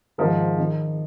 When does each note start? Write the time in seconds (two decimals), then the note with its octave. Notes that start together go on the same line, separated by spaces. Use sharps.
0.18 G#2 D#3 F3
0.58 D#3